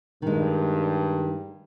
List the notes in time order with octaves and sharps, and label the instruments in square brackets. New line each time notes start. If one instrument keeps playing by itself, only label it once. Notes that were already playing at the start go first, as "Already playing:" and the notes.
[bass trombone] G2 [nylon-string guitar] D#3 G#3